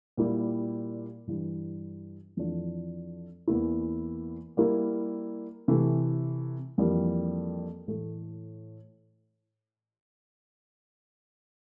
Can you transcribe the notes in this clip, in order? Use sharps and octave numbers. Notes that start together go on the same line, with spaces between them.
A#2 G3 A#3 E4 G4
G2 E3 G3
F2 E3 A3 D4 F4
E2 E3 A#3 E4
G3 A#3 E4 A#4
C3 E3 A3
F2 E3 G3 A#3
A2 E3 A3